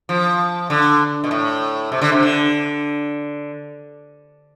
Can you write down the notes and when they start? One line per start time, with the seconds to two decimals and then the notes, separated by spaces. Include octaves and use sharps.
0.09 F3
0.70 D3
1.24 B2
1.31 A2
1.92 C3
2.01 D3
2.12 C3
2.23 D3